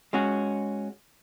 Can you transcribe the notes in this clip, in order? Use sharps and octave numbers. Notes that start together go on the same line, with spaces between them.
G#3 C#4 F#4